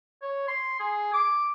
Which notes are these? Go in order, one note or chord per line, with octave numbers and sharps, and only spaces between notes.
C#5
C6
G#4
D6